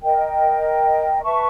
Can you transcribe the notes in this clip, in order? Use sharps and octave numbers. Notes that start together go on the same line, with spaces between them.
A#4 D#5 G5
B4 E5 A5 C#6